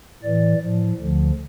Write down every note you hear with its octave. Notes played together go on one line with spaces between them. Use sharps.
A2 E3 D5
A2 F3
D2 D3 F3